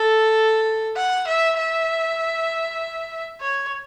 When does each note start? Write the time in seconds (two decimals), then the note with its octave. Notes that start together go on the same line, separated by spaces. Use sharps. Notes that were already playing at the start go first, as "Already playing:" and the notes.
Already playing: A4
0.97 F#5
1.28 E5
1.57 E5
3.41 C#5